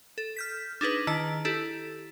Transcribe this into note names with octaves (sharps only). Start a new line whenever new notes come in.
A4
F6 G6 B6
D4 D#4 G#4 B4
D#3 E4 A5 D7
E4 G4 A4